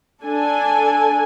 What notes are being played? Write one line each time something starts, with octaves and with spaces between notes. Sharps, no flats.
D4 A4 G#5